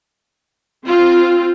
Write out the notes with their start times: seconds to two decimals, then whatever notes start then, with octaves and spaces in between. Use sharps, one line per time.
0.87 C4 F4